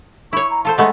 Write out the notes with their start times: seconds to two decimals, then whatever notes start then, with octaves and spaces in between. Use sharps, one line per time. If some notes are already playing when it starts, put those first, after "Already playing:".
0.33 E4 C#5 C#6
0.50 A#5
0.65 F4 A4 C5 A5
0.78 G#3 A3 B3 D#5